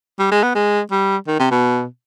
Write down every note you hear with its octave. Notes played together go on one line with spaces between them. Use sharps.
G3
G#3
B3
G#3
G3
D#3
C3
B2